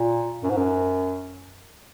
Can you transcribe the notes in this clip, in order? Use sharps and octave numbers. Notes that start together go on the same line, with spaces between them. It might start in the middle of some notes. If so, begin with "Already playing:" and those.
Already playing: A#2
F#2
G#2
F#2